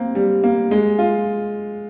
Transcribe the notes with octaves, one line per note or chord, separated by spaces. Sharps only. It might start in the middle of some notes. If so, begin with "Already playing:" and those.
Already playing: A#3 C4
G3
A#3
G#3
F4